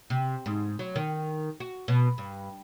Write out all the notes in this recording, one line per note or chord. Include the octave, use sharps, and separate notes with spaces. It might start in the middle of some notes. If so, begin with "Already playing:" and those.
C3
G#2
F#3
D#3
F#4
B2
G2